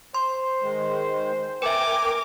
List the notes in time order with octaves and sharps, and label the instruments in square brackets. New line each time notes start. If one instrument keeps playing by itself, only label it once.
[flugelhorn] C5 [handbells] C6
[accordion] D#3 G#3
[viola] A#4 D6 [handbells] B4 E5 [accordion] G5 G#5